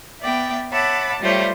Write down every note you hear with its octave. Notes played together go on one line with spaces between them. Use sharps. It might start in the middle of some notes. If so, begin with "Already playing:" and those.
B3 D5 E5 G5
C#5 E5 F#5 A5 B5 D6
G3 A3 F4 G4 C5 C#5